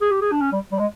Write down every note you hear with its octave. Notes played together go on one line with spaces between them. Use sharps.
G#4
G4
G#4
D4
C#4
G3
G3
G#3